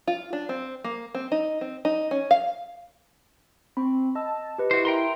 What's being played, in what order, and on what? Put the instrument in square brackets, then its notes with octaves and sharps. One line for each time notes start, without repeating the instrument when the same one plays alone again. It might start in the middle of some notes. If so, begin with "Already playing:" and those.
[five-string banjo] F4
D4
C4
A#3
C4
D#4
C4
D#4
C#4
F5
[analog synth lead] C4 [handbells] B5 C#6
[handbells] D#5 E6 [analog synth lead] A5
[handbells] G4 B4 D#5
[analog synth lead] E4 [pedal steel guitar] F#4 C5
[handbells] A#4 E5 [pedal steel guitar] G5 A#5 C6